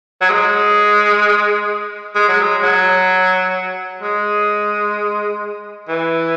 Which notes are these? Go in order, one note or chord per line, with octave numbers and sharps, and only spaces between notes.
F#3
G#3
G#3
F#3
G#3
F#3
G#3
E3